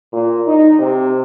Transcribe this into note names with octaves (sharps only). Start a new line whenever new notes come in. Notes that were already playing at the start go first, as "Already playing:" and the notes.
A#2
D#4
C3